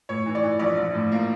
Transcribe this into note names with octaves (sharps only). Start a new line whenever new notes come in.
A2 C#5
E3
D5
E3
A#1 D5
A#1
A2
A#3